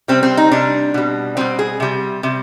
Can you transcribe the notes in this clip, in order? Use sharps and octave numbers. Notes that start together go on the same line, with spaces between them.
C3 G3 C4
C4
D#4
C3 G3 D4
B2 G3
B2 G3 C4
G#4
C3 G3
C3 G3